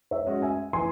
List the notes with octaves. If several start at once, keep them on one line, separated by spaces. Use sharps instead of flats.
C#5 E5
G#3 C#4 F#4
E5 G#5
E3 G#5 C6